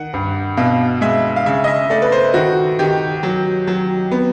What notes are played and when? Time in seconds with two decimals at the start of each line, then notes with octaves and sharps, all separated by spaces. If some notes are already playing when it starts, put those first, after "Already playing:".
Already playing: D#3 F#5
0.13 G2
0.57 B2 F5
1.01 G#3 E5
1.36 F5
1.46 C#3 E5
1.64 D#5
1.67 E5
1.90 A3 D5
2.02 B4
2.12 C5
2.34 D#3 F#4
2.79 D#3 G4
3.23 F#3
3.67 F#3
4.11 B3